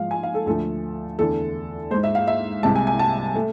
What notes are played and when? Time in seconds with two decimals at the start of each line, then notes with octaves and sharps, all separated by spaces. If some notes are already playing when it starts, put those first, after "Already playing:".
Already playing: G#2 F3 G#3 F5
0.11 G#5
0.23 F5
0.35 A4
0.46 D2 D3 F3 A3 A4
1.19 E2 D3 A3 A4
1.91 G#3 C5
1.94 G#2
2.03 E5
2.15 F5
2.27 E5
2.63 C2 C3 G#3 A5
2.76 G#5
2.87 G#5
2.99 A5
3.35 A3